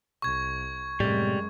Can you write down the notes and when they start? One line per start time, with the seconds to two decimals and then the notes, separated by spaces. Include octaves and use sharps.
0.22 C2 C#6 G#6
1.00 F#2 A2 C3 G3 G#3